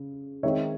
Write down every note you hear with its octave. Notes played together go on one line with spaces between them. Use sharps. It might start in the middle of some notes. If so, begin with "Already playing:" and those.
Already playing: C#3
D#3 G#3 C4 D#4 C#5 E5